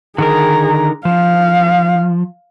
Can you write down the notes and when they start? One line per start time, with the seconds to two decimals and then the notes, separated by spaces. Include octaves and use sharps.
0.18 D3 D#3 G#4 A#4 A#5
1.05 F3 F5